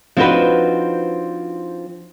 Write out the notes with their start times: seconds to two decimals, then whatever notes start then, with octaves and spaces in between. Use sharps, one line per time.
0.17 F3 C4 D4 D#4 F#4 B4